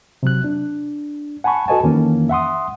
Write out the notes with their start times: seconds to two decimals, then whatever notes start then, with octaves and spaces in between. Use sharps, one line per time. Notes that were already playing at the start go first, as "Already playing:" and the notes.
0.23 C3 F#3 F#6
0.44 D4
1.44 F#5 G#5 A5 B5 C#6
1.68 F#4 A4 B4 D#5 G#5 A5
1.83 F2 D#3 E3 A#3 C#4
2.29 E5 F#5 C6 D#6